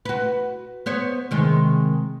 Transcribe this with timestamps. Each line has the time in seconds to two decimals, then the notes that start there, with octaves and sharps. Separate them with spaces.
0.05 F#4 B4
0.86 B3 C5 C#5
1.31 C3 D#3 G#3